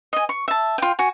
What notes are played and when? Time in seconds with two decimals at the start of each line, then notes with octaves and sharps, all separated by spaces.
0.13 D#5 G#5
0.29 C#6
0.48 E5 A5
0.78 F4 G5
0.99 F#4 G#5